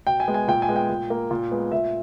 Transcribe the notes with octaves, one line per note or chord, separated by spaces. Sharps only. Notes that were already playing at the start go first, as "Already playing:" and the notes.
B2 G5
G#5
G#3 B3
G#5
A#2 G5
G#5
G#3 B3
G5
A#2
A#3
A#2
G#3 B3
A#2 E5